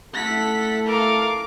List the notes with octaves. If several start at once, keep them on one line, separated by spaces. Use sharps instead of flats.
A3 E4 A4 F#5 B6
A#4 F5 D6